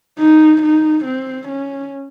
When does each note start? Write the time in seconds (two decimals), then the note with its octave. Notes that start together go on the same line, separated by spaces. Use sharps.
0.19 D#4
0.62 D#4
1.05 C4
1.48 C#4